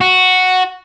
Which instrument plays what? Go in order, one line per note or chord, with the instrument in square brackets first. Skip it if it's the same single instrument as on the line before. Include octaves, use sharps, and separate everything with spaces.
[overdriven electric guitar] F#4